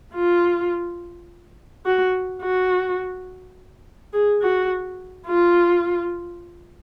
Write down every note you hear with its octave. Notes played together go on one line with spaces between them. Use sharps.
F4
F#4
F#4
G#4
F#4
F4